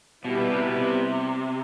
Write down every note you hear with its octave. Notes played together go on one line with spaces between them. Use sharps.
B2 G3 B3 E4 G4 B4
B2
C3
B2
C3